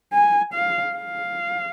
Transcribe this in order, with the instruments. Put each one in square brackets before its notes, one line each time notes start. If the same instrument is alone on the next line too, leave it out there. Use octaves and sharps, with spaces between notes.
[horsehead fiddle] G#5
F5
F5